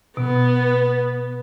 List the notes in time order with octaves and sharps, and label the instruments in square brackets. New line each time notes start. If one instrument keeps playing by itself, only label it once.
[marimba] B2 [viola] B3